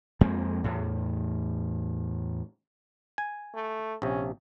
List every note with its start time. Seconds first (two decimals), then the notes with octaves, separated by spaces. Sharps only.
0.21 F2 G#3 A#3 C4
0.64 E2 A2
3.18 G#5
3.55 A3
4.02 A#1 C3 C#4